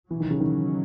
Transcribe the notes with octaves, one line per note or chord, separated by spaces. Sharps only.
B2 E3 F#3 C#4
D#3
C#3
D#3